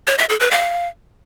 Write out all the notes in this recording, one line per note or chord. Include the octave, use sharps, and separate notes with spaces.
C#5
E5
A4
B4
F5